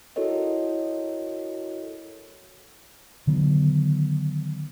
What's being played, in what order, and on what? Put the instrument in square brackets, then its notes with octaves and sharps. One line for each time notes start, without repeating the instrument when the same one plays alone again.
[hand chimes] E4 F#4 A4 A#4 C#5 D#5
[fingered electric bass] D3 D#3 F#3 B3